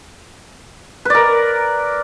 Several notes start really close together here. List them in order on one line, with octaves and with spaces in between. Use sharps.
B4 D5 A#4